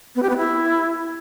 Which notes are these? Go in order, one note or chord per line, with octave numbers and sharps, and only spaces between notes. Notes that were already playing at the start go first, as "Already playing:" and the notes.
B3
G4
B3
E4